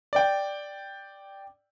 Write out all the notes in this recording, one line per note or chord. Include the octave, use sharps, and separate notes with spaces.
D5 G5